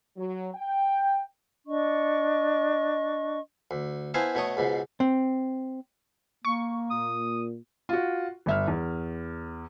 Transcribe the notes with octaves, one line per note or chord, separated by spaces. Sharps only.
F#3
G5
D4 D#5 C#6
D2
B3 E4 C5 F5 G#5 A5
B2 A3 C#5 D#6
C#2 G#2 B2
C4
A#3 C#6
A#2 D#6
F4 F#4
G1 E5 F6
E2